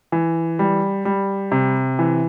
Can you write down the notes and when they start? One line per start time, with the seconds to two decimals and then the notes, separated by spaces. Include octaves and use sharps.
0.12 E3
0.59 G3
1.05 G3
1.52 C3
1.99 E3